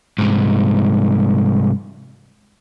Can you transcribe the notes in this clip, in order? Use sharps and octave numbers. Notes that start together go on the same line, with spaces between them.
C2 G#2